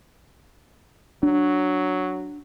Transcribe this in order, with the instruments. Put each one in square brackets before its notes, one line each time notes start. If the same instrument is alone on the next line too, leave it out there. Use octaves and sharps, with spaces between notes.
[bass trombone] F#3 [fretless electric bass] D4